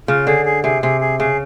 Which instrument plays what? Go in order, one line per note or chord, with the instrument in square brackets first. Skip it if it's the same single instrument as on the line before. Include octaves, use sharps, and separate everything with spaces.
[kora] C#3 [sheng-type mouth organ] F4
[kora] D3 [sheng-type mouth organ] G#4
[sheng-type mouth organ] G#4
[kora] C3 [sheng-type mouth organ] G#4
[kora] C3 [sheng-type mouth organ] G#4
[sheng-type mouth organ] G#4
[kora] C#3 [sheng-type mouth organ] G#4